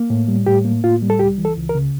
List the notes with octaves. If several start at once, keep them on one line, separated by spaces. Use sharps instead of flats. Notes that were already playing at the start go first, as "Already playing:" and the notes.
Already playing: A#3
A2
G3
A2 G4
A#3
A2 F4
G3
A4
C#2 G4
E3
A4
C#2
A#4
C#3